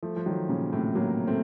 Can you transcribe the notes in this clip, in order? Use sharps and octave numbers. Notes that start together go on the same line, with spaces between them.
F3 A3
F3
D#3 F#3
A#2 C#3
A2 C3
F#3 A#3
A3 C4